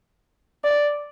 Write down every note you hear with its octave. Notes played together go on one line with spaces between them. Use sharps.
D5